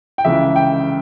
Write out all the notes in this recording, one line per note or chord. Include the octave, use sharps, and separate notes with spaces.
G5
C#2 C#3 E3 E5
G5